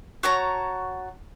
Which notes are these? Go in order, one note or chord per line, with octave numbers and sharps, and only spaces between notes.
F#4 C#5 A5 A#5